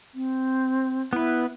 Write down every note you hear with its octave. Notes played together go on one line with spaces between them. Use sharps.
C4
B3 E4 B4